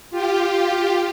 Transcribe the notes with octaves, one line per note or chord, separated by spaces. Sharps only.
F4 G4